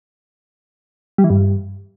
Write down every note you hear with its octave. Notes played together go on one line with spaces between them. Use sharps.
G3
E3
G2